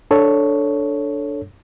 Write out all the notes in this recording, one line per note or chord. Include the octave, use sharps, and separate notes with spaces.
D4 A4 C#5